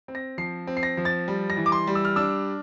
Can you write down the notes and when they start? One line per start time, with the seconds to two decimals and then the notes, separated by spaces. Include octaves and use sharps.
0.08 C4
0.15 A#6
0.38 F3 C7
0.67 C4
0.77 C7
0.83 A#6
0.97 F3
1.05 A6
1.28 G3
1.50 A#6
1.57 E3
1.66 D6
1.72 C6
1.87 G3
1.95 E6
2.05 F6
2.16 D4 E6